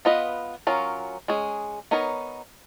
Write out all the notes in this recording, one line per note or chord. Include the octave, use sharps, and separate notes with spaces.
B3 F4 B4 D#5
F#3 C#4 F4 A#4
G#3 C#4 G#4
B3 D#4 A#4 C#5